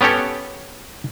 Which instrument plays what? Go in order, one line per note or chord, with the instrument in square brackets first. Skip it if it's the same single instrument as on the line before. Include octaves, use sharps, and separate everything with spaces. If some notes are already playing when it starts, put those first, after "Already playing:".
[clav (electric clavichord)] B3 C#4 G4 A4 C#5